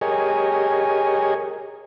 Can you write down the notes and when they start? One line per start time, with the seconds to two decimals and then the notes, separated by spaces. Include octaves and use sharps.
0.01 G4 G#4 A#4 C#5 D#5 G#5